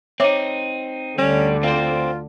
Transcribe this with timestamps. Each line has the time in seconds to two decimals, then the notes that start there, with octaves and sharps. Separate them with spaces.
0.20 C4 D#4 C#5 E5 D6
1.18 D2 D3 G3 C#4
1.63 C4 F4 C5